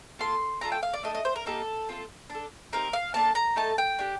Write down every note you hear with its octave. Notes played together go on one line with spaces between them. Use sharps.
A#3 F4 A4 C6
A3 D4 F4 A4 A#5
G5
F5
D5
A3 D4 A4 D#5
D#5
C5
A#4
A#3 D#4 G4 A4
C4 F4 A4
D4 A4
C4 D#4 G4 A#4
F5
A#3 D4 A4 A5
A#5
A3 D#4 A4 A5
G5
D4 G4